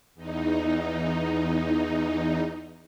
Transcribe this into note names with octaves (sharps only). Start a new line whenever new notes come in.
E2 D#4